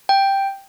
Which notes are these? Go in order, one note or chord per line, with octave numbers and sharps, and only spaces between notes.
G5